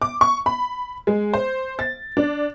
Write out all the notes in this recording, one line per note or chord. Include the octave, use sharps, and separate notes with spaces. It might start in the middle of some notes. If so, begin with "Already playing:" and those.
D6
C#6
B5
G#3
C5
A6
D4